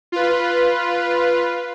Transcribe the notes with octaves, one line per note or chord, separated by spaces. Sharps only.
F4 B4